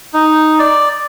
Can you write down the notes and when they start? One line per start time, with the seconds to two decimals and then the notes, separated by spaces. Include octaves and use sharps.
0.14 D#4
0.59 D5